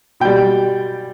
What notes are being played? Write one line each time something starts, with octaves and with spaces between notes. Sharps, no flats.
B2 G3 G5